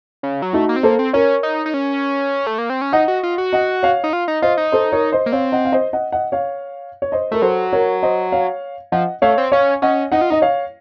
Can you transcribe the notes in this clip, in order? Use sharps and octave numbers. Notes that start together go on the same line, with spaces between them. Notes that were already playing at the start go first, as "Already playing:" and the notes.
C#3
F#3
A3 D#4 F#4
A#3
C4
A#3 A4 C5
C4
C#4 A#4 C#5
D#4
D#4
C#4
A3
A#3
C4
C#4
D#4 D#5 F#5
F#4
F4
F#4
D#5 F#5
C#5 F5
D#4
F4
D#4
F4 C5 D#5
D#4
A4 C5
A#4 C#5
C5 D#5
A#3
C4 C#5 F5
D#5 F#5
F5
C5 D#5
D#5 F#5
D#5 F#5
C#5 F5
C#5
C5 D#5
A3 A#4
F#3 A4 C5
A#4 C#5
C5 D#5
C#5 F5
F3 D#5 F#5
A3 C#5 F5
C4
C#4 C#5 F5
C#4 D#5 F#5
D#4 D#5 F#5
F4
D#4 D#5
C#5 F5